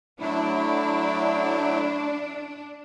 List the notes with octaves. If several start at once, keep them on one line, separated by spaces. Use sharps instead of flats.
F#3 A3 D4 E4